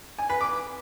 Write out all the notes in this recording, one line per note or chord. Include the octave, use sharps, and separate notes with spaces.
G#5
B4
D6